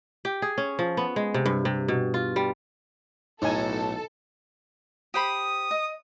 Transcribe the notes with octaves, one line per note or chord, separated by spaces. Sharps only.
G4
G#4
C#4
F3
B3
G#3
C3
G2
C3
B2
F4
G3
B1 A2 D#4 A4 G#5
G4 C5 B5 D#6
D#5